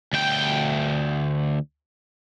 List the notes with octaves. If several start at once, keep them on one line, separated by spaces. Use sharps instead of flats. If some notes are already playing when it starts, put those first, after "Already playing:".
D2 G5